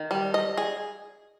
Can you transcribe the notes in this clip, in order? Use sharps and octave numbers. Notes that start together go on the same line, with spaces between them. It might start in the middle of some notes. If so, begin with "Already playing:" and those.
Already playing: D#3
G3
D#5
G#4